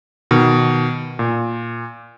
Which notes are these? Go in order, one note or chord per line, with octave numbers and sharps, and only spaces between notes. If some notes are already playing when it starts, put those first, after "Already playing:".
B2 D#3
A#2